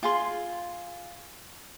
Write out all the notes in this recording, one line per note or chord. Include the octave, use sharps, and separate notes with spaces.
F4 G#4 C6